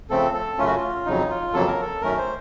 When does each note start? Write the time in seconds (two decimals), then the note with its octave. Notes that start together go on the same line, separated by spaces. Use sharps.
0.10 C#3 F3 A3 C4 A4
0.34 A4
0.58 F#2 C#3 A3 C#4 F4
0.67 F#4
0.77 F4
1.06 F2 C#3 F#3 D#4
1.30 F4
1.54 F2 C#3 F#3 A#3 A4
1.67 A#4
1.81 A4
2.01 F#2 D#3 A3 C#4 A#4
2.18 C5